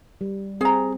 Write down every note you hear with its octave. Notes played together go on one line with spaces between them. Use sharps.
G3
C4 G#4 A#5